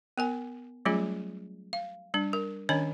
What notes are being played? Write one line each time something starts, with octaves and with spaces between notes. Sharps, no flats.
B3 A#4 G#5
F#3 G3 A3 C#4 F4 G#4
F5
G3 D4
A#4
D#3 C#4 D4 C#5 D#5 B5